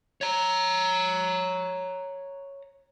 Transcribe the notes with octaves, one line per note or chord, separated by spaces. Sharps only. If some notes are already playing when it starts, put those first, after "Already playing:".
C#5 A#5